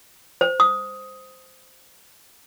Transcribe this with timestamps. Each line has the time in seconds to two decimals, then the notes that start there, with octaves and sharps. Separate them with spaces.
0.41 C5
0.60 D#6